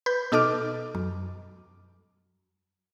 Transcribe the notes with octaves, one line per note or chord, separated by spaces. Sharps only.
B4 G6
B2 D#4 A4 D#5 D6 F6
F#2